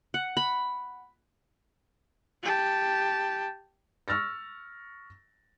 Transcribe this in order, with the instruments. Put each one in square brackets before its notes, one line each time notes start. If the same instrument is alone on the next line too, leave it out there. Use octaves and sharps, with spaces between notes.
[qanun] F#5
B5
[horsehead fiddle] G4 A5
[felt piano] C#6 E6 F6 A6 A#6